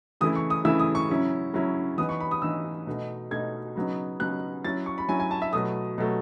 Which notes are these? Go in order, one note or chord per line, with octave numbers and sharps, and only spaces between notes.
C#3 E3 A3 E4 D#6
C#6
D#6
C#3 E3 A3 E4 E6
D#6
C#6
C#3 F#3 C#4 E4
C#3 F#3 C#4 E4
E3 B3 D#4 D#6
C#6
B5
D#6
E3 B3 D#4 E6
B2 A3 D#4
B2 A3 D#4 G#6
C#3 F#3 B3 D#4
C#3 F#3 B3 D#4 F#6
F#3 C#4 E4 A6
C#6
B5
F#3 C#4 E4 G#5
G#5
A5
E5
B2 F#3 A3 D#6
B2 F#3 A3